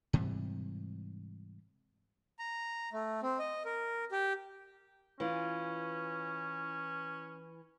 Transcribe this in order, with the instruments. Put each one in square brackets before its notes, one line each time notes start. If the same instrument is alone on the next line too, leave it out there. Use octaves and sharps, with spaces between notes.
[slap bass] G#2 C3 E3 G3
[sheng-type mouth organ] A#5
A3
C4
D#5
A#4
G4
[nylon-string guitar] E3 F4 [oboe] C#4